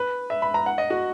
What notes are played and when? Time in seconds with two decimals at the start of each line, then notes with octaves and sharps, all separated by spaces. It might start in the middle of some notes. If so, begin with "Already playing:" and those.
Already playing: B4
0.30 E5
0.42 B5
0.54 A#5
0.66 F#5
0.78 D#5
0.90 F#4